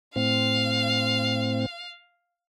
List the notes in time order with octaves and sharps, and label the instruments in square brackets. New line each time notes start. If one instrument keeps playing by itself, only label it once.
[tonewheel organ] A2 C4 [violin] F5